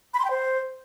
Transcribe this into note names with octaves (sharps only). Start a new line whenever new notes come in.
B5
C6
G5
C5